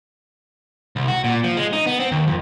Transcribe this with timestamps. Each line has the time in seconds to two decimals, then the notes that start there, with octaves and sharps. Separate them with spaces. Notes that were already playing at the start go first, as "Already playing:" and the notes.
0.96 C2
1.08 F#4
1.24 A#2
1.44 F3
1.57 G#3
1.73 D#4
1.86 B3
2.00 C4
2.12 D#2
2.27 F2